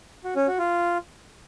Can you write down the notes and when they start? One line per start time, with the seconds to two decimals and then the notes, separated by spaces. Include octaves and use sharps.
0.24 F#4
0.36 C#4
0.47 F#4
0.59 F4